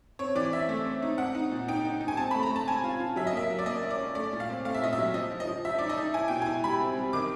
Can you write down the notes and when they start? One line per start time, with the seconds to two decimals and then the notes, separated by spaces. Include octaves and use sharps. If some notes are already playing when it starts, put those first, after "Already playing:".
0.19 C4 C#5
0.35 E3 D5
0.52 C4 E5
0.69 A3
0.85 C4
1.02 D#4
1.18 C4 F#5
1.35 D#4
1.51 A#2
1.68 D#4 G5
1.85 D#4
2.01 D#4
2.08 G#5
2.17 C4 A5
2.31 A3 B5
2.43 A#5
2.50 A3
2.56 A5
2.67 C4 G#5
2.84 F4
3.00 F4
3.16 F#3 E5
3.27 D#5
3.33 A#3 E5
3.50 F#3
3.59 D5
3.66 A#3 D#5
3.83 C#4
3.90 D5
3.99 C#4
4.15 A3 D5
4.33 A#2
4.40 F5
4.49 C4
4.65 A3 F5
4.75 E5
4.82 A#2 D#5
4.93 E5
4.98 F#3
5.14 F3 D#5
5.31 F3
5.40 D#5
5.47 F3
5.65 F3 E5
5.79 D#4 D5
5.89 D#5
5.98 D#4
6.14 E4 G#5
6.28 B2 G5
6.42 E4 G#5
6.63 G3 B5
6.80 C4
6.97 G3
7.13 D#3 D6